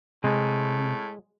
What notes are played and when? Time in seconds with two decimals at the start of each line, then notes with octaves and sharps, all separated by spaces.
0.24 A2 C3 G#3